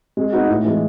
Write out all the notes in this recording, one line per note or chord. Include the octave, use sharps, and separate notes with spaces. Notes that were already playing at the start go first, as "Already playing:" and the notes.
G#3
B3 D#4 F#4
A2
E3 G#3